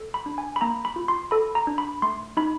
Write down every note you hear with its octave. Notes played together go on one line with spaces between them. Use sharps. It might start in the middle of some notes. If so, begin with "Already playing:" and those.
Already playing: A4
B5
D4
G#5
B5
A#3 A#5
B5
F4
C6
A4 B5
A#5
D4
B5
A3 C6
D#4 B5